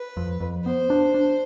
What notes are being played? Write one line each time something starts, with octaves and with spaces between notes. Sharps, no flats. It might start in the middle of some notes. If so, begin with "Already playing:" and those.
Already playing: B4
F2
F2
B3 C5
D4
D4